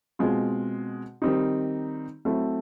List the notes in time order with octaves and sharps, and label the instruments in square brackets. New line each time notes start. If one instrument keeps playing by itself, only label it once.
[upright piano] B2 G#3 C4 F4
D#3 G3 C4 D#4
F#3 A3 C4 E4 A4